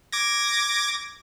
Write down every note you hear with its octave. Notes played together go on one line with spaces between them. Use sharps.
D6 G#6 A#6